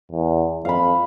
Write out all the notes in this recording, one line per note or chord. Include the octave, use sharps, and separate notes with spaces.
E2
F2 F5 B5